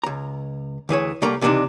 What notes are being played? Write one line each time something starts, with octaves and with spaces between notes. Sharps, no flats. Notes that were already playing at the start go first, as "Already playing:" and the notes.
C#2 A#5
D2 E3 G#4 C#5
C2 G3 A3 A#3 A#5
C#2 C3 E3 A3 D4 D#4